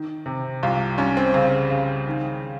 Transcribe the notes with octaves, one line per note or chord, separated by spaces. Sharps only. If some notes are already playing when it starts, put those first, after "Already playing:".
Already playing: D#3
C3
C2 F4
C2 C#4
C4
C#3 C4
C#3
D#3